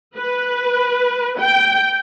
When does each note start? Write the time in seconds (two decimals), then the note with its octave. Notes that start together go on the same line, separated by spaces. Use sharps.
0.17 B4
1.39 G5